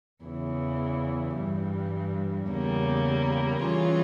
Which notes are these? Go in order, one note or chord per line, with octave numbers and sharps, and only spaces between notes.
E2 C#3 E3
G2 E3 G3
E2 C#3 G3 A#3
E3 G3 C#4 F4 G#4